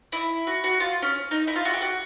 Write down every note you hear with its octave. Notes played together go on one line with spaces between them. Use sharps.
E4
F#4
F#4
F4
C#4
D#4
E4
F4
F#4
G4
F#4